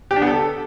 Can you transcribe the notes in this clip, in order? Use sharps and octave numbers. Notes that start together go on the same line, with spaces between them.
G4
D4
B3
A4